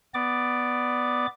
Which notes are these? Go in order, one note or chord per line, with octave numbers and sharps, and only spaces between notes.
B3 D5 D6